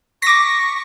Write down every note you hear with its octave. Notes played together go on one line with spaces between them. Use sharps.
C#6 D6 A#6 B6